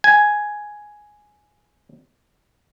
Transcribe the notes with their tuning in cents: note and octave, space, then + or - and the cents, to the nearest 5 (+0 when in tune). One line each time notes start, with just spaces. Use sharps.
G#5 +5